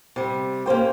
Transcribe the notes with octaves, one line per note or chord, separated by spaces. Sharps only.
C3 G3
A#3 C#4 C5 G5